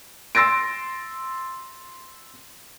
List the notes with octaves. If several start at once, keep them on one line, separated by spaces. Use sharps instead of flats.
C6 E6 A6 A#6 D7